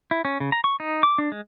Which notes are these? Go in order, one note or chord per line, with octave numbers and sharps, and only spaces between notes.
E4
C#4
C#3
A#5
C#6
D#4
D6
D4
G#3